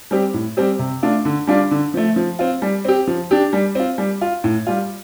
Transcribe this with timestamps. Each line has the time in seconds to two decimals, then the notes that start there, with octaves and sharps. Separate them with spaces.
0.11 G3 C4 G4
0.34 A2
0.57 G3 C4 G4
0.79 C3
1.03 A3 D4 F4
1.25 D3
1.47 G3 D4 F4
1.71 D3
1.94 F3 A3
2.16 F3
2.39 C4 F4
2.62 G3
2.85 C4 G4
3.07 F3
3.31 D4 G4
3.53 G3
3.75 C4 F4
3.98 G3
4.21 F4
4.44 A2
4.67 G3 F4